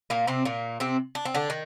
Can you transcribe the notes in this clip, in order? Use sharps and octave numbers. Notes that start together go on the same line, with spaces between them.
A#2 A#3
C3 C4
A#2 A#3
C3 C4
D4
C4
D3 D4
D#3